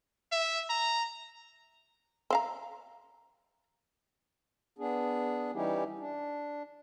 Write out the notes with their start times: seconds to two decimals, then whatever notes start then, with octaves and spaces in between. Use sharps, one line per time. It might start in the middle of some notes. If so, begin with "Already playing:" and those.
0.32 E5
0.70 A#5
2.30 C4 F5 A#5
4.78 B3 D4 G#4
5.54 E3 G3 C#4 D#4 E4 G4
5.98 D4